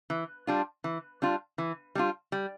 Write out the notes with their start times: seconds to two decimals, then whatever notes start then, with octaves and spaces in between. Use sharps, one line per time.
0.10 E3
0.47 G3 D4 F4
0.84 E3
1.22 G3 D4 F4
1.58 E3
1.95 G3 D4 F4
2.32 G3